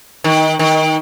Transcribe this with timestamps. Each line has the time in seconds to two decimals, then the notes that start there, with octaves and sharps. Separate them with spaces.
0.24 D#3
0.59 D#3